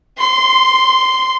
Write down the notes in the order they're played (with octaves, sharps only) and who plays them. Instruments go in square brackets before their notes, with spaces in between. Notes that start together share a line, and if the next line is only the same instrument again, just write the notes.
[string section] C6